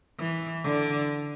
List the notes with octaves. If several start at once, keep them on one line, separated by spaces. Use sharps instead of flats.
E3
D3